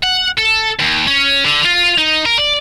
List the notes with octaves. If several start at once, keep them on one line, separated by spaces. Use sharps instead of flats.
F#5
A4
D#2
C#4
D3
F4
D#4
A#4
D5